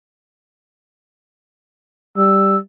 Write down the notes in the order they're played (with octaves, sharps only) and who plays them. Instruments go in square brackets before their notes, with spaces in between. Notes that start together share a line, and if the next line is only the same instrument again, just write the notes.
[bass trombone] G3 [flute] E6